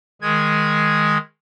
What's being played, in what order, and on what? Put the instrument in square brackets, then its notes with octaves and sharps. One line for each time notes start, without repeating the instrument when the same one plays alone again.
[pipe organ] D#3 G#3 G#4 G#6